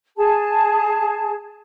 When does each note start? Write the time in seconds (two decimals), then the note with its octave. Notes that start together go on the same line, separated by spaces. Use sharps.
0.16 G#4 A5